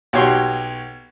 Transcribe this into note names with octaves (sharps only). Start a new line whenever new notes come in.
B1 F#4 G4 C#5 C6